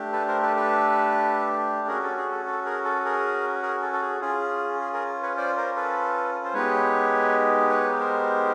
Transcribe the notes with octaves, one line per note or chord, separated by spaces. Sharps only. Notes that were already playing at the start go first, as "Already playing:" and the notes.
Already playing: A3 D4 G4
A4 B4
A#4 C5
A4 B4
A4 B4
C#4 F#4 G#4 A#4
A4
G#4
A4
A4
G#4 A#4
A4
G#4 A#4
G#4 A#4
A4
A4
G#4
C#4 F4 G#4
G#4
G#4 A#4
B4 C#5
C5 D5
A#4 C5
A4 B4
C5
G#3 B3 D#4 G4 B4 C#5
B4 C#5
A#4 C5